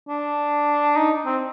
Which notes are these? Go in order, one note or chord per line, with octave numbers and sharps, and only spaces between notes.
D4
D#4
C4